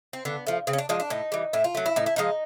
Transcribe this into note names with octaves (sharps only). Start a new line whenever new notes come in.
C4
D3 B3
F3 A3
C#3 C4
C#4
D4
F3 G#3 D4
D4
A2 D#4
E3 G3
A2 E4
F4
F#3 A3
E4
A2 D#4
E4
F3 G#3 D#4